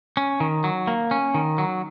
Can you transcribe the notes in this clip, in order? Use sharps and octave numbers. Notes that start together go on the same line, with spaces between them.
C#4
D#3
F#3
A#3
C#4
D#3
F#3